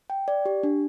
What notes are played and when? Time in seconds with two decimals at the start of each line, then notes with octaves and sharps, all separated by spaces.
0.10 G5
0.28 D5
0.46 G4
0.63 D4